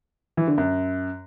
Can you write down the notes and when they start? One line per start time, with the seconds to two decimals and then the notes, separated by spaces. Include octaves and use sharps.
0.37 E3
0.48 D3
0.58 F#2